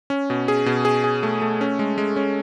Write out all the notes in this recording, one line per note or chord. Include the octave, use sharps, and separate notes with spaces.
C#4
B2
G#4
B2
G#4
G#4
A3
A3
C#4
G#3
G#3
C#4